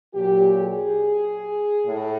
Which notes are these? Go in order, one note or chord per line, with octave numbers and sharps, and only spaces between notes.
A#2 F#3 G4
G#4
A2